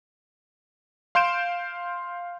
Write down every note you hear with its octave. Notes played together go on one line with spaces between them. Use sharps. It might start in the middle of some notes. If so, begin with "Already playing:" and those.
F5 C6 G6 D7 E7